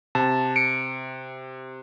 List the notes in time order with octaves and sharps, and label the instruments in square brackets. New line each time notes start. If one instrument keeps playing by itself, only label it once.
[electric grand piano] C3 [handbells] A5
[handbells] C#7 D7